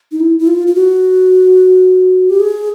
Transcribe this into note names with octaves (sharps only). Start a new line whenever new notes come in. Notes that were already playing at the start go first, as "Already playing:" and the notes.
D#4
E4
E4
F4
F4
F#4
G4
G#4